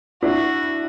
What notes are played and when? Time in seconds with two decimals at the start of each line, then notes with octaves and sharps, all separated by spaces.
0.22 D4 E4 F#4